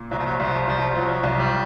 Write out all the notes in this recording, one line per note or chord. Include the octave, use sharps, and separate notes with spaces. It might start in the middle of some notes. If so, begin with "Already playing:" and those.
Already playing: A#2
C2 F#3
F3
F#3
C2 F3
C2 F3
F3 F#3
C2
G3